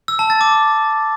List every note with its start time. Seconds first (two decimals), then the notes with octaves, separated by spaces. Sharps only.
0.08 E6
0.19 A5
0.30 A6
0.41 D6